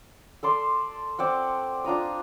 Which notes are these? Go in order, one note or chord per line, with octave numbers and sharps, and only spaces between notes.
A4 D5 C6
C4 D5 F#5
D4 F4 A#5 D#6